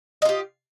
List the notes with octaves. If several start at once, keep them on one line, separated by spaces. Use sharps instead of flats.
F4 G4 D#5